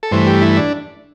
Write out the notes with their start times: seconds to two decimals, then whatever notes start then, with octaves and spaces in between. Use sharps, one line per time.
0.03 A4
0.11 G2 E3 A3 C5
0.27 G4
0.42 E4
0.57 D4